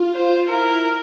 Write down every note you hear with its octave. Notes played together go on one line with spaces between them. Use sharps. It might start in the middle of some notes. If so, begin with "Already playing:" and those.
Already playing: F4
C5
E4 A#4